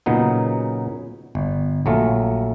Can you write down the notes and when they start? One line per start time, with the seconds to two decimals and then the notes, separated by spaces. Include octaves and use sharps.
0.06 A#2 C#3 F#3 B3 D#4
1.35 G1
1.86 A#1 F#3 A3 F4